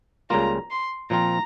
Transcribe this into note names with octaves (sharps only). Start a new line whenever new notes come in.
C#2 C#3 G3 A#3 F4 A#5
C6
A#2 F3 C4 F4 A#5